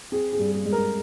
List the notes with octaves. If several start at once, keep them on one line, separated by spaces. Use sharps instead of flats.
C4 G#4
G#4
G2
G#4
G#3
A#4